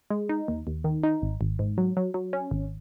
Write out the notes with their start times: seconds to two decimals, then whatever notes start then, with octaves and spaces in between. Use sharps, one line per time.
0.10 G#3
0.29 D#4
0.48 D#2
0.67 D#2
0.84 D#3
1.03 D#4
1.22 G#1
1.41 G#1
1.59 G#2
1.78 F#3
1.97 F#3
2.14 F#3
2.33 C#4
2.51 G#1